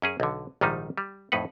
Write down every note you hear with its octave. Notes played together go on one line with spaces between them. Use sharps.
F#2 C#4 G#4
B1 D3
A#1 G#2 D#3 G3 D#4
G3
F2 A2 D#4 B4 F#5